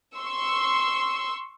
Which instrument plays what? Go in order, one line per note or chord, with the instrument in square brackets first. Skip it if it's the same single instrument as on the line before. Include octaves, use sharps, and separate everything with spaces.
[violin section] C6 C#6 E6